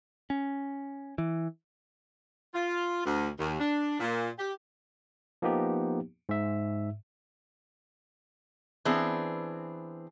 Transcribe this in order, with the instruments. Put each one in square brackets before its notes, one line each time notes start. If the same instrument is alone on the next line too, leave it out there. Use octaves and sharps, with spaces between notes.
[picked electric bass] C#4
E3
[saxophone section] F4
D2
D#2
D4
A#2
G4
[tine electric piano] F3 A#3 B3 D#4 G4
G#2 E5
[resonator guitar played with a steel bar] E3 B3 C4 D4 G#4